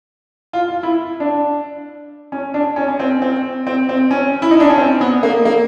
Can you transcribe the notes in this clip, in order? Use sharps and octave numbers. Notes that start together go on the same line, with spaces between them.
F4
F4
E4
D4
C#4
D4
C#4
C#4
C4
C4
C4
C4
C#4
E4
D#4
D4
C#4
C4
B3
A#3
A#3